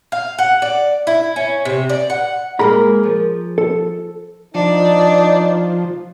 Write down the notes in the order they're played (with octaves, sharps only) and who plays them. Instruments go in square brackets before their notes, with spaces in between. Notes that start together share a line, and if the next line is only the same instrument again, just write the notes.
[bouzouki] F5
F#5
D5
E4
C#4
C3
D5
F#5
[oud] G#3 A#3 A#4 [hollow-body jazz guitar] G#4 A#5 B5
[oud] F3
[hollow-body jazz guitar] A4
[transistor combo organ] F3 [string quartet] D4 [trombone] D#4